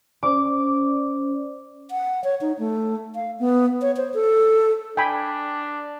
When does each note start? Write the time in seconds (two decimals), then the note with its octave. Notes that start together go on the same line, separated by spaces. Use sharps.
0.23 C#4 C5 D5 D6
1.91 F#5
2.24 C#5
2.41 D#4
2.59 A3
3.15 F5
3.40 B3
3.82 C#5
3.97 C5
4.14 A4
4.97 D4 G5 G#5 B5